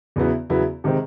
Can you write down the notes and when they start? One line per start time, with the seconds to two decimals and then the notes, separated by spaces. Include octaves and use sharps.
0.16 E2 C#3 F#3 B3 E4
0.50 E2 C#3 F#3 B3 E4
0.84 C3 D#3 G#3 C4